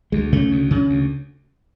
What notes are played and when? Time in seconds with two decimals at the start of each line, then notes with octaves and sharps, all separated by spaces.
0.12 D2 G#3
0.32 C#3 A3
0.51 D2
0.71 C#3
0.90 D2